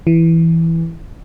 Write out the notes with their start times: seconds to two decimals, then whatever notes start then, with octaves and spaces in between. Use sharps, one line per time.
0.07 E3